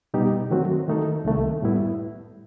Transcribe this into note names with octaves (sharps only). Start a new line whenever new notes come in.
B2 G3 B3 D#4 G4
D#3 F#3 A3 C4 F#4
D#3 A3 D#4 A4
C2 C3 D#3 A3
A2 G3 B3 E4